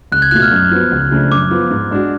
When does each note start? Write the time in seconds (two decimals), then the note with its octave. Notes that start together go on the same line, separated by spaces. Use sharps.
0.12 C#2 F#6
0.22 G#6
0.31 B2 A3 F4 F#6
0.42 F6
0.51 F#2
0.71 F3 B3 F#4
0.91 C#2
1.11 C#3 F3 A3 D4
1.32 F#2 D6
1.51 F3 B3 F4
1.71 G#2
1.91 G#3 D4 F#4